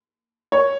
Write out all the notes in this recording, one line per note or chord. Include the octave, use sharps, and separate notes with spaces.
C#5